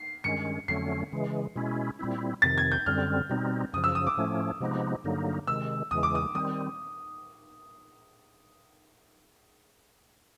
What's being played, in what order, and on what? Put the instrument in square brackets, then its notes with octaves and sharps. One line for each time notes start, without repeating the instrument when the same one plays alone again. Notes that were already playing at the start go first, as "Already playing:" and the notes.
Already playing: [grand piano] C7
[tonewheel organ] G2 D#3 G#3 C#4 [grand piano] C#7
[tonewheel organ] F2 D3 F#3 A3 C#4 [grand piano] C7
[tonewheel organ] C#3 E3 G#3
B2 G#3 C#4 E4
A#2 G3 C4 E4
[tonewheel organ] F2 C3 D#3 [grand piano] A6
[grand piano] G#6
G6
[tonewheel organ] F#2 D3 G3 C4 [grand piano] F6
[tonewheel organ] B2 G3 C4 D#4
[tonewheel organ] F#2 C#3 F3 [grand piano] D#6
[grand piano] E6
D#6
D6
[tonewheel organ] A2 F3 A3 C#4
C3 F3 G#3 B3 D#4
G2 D3 F#3 A#3 D#4
[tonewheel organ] C3 D#3 G#3 [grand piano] E6
[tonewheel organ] E2 C#3 E3 G#3 [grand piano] D#6
[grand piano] D6
D#6
[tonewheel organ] D#3 G3 C4 [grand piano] D#6